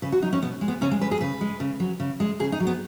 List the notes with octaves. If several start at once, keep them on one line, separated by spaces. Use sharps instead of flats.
C#3 B4
F#4
F#3 D#4
C#4
B2 B3
G#3
B3
C#3 C#4
G#3
G#3 B4
G#4
C#3 B4
G#3
C#3
F#3
C#3
G#3
C#3 G#4
D#4
F#3
B3